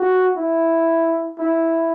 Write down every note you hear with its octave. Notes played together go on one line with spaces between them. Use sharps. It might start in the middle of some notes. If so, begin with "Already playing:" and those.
Already playing: F#4
E4
E4